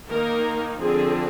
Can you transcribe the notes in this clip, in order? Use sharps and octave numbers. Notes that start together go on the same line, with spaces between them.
D#3 A#3 D#4 A#4
D3 F3 C4 G#4